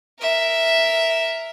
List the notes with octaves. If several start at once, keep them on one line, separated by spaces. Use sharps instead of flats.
A#4 E5